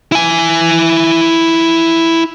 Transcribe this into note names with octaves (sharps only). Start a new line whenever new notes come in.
E4 G#5